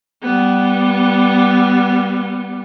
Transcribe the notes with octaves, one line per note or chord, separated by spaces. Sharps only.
G3 B3